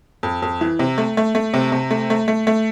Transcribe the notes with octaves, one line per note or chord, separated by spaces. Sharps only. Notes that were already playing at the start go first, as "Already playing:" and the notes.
F2
F2
E3
C3
A3
A3
A3
C3
C3
A3
A3
A3
A3